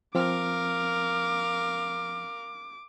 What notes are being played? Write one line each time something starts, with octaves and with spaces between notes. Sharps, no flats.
F3 C4 A#4 F5 D6